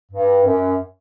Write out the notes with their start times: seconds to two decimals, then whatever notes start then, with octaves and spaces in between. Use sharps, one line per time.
0.12 G2
0.45 F#2